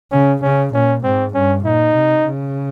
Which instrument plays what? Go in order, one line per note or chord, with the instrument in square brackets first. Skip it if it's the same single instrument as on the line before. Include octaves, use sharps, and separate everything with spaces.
[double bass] C#3 [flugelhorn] C#4
[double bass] C#3 [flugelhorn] C#4
[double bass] A#2 [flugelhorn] C#4
[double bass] G#2 [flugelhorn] C4
[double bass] G2 [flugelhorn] C#4
[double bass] A#2 [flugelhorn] D#4
[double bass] C3
C#3